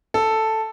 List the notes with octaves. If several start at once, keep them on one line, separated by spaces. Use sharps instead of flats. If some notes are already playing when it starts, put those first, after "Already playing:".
A4